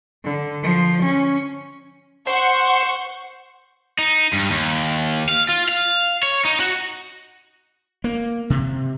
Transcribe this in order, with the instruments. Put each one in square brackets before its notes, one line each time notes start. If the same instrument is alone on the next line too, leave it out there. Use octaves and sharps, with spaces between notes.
[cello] D3
F3
C#4
[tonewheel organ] C5 C6 [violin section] F#5 C#6
[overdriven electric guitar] D#4
G2
D#2
F5
F4
F5
C#5
D#4
F#4
[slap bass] A#3
C3